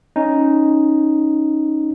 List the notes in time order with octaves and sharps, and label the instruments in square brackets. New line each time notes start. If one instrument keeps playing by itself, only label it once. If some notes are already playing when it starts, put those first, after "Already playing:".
[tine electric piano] C#4 D#4